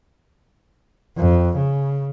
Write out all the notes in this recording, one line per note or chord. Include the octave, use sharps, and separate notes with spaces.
F2
C#3